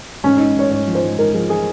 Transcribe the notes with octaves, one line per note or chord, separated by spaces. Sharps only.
G#2 C#4
G#2 D#4
G#2 C#5
G#2 C#5
F3
C5
G#2
G#2 A#4
F3 G#4
G#4